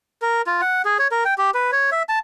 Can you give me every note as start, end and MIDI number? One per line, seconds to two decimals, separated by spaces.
0.22 0.42 70
0.47 0.61 65
0.61 0.82 78
0.85 0.98 68
0.99 1.08 73
1.12 1.24 70
1.25 1.34 79
1.38 1.51 67
1.54 1.71 71
1.72 1.90 73
1.92 2.03 76
2.09 2.19 81